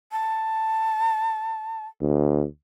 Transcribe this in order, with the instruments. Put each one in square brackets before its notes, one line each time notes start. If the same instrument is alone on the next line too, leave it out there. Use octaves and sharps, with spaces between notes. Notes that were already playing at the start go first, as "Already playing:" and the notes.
[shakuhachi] A5
[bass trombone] D2